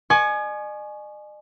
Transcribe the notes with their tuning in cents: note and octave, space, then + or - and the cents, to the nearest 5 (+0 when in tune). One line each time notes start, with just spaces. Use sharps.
D#5 -45 G#5 +20 C#6 +0